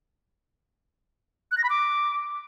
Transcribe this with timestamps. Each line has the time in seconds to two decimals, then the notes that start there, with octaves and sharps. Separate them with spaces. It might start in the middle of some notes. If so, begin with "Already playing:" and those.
1.51 F#6
1.58 A#6
1.64 B5
1.70 D6